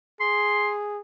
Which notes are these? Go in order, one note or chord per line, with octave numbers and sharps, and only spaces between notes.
G#4 C6